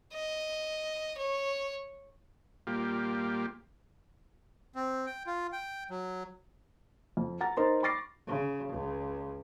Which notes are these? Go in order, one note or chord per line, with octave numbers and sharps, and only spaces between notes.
D#5
C#5
A#2 G3 A#3 F4 G4
C4
G5
F4
G5
F#3
F2
F#5 A#5 A6
D#4 A#4 C5 D#5 A#5 C6
B5 C#6 D6 A6 A#6 C7
C#3
C#2